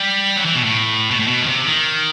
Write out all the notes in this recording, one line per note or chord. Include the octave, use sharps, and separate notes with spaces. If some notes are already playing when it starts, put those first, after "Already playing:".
Already playing: G3
F#3
E3
B2
A2
B2
A2
B2
D#3
C3
D#3